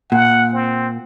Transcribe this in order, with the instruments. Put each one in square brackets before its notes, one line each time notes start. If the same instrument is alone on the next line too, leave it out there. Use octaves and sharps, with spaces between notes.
[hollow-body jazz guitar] A#2 [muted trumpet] F#5
[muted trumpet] C4